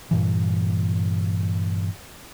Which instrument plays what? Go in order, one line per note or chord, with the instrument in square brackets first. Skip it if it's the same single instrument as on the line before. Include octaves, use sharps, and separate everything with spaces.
[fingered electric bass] G2 A#2 E3